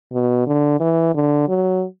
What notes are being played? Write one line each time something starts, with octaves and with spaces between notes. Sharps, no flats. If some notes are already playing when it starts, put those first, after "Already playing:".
B2
D3
E3
D3
F#3